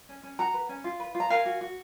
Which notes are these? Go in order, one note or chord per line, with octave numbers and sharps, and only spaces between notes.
C#4
C#4
F#4 F#5 A#5
B4
C#4
F4
B4
F4
A#5
A#4 F5 G#5
F#4
F#4